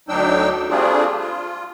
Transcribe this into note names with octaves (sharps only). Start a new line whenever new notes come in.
D2 F#3 D4 D#4 G5 E6
G3 A3 C4 D4 F4 G#4
F4